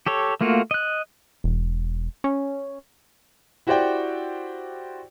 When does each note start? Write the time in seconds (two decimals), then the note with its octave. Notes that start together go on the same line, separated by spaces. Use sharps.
0.07 G4 A4 C#5
0.41 A3 A#3 F4 F#4
0.71 D#5 F#6
1.44 E1
2.24 C#4
3.67 E4 F#4 G4 C5 D5 G5